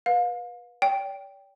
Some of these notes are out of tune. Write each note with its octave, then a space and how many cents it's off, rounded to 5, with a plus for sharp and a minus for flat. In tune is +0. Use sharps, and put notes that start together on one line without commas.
B4 -20 F5 +35
D5 -45 G5 +0